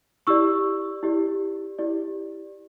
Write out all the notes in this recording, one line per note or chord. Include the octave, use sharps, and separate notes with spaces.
E4 G4 D5 C#6 E6
E4 G4 D5
E4 G4 D5